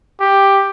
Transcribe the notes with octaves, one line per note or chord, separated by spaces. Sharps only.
G4